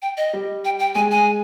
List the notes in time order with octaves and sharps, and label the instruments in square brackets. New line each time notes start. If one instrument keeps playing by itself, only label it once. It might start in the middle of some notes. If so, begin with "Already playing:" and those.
[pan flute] G5
D#5
[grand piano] G3
[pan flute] G5
G5
[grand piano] G#3 [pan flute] G#5
[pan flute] G#5